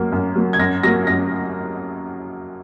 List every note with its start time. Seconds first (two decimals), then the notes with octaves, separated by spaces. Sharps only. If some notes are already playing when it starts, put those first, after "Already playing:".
Already playing: F#2 F#3 A#3
0.12 F#2
0.36 F#3 A#3
0.53 G#6
0.59 F#2 A#6
0.83 F#3 A#3 A#6
1.07 F#2 A#6